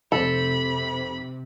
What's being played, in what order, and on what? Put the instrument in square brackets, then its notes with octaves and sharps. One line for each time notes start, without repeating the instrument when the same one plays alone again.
[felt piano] F1 C5 [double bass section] C3 [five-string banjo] A4 [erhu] B5